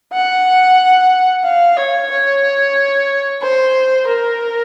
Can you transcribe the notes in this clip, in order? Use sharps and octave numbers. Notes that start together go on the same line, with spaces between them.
F#5
F5
C#5
C#5
C5
A#4